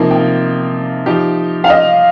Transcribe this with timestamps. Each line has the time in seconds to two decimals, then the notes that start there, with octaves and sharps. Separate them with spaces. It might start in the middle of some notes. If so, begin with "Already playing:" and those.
Already playing: C3 F3 A#3 D#4
0.11 G5
1.06 F3 D#4 G4
1.64 F5
1.70 D#5